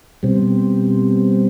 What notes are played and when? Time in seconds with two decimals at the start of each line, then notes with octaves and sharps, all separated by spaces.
0.23 B2 G3 C4